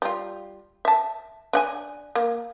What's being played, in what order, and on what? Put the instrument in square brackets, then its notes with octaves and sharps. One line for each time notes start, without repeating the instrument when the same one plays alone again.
[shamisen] G3 F4
E5 A5
D4 F#5 G#5
A#3